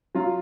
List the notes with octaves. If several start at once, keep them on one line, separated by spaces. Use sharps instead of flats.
F#3 F4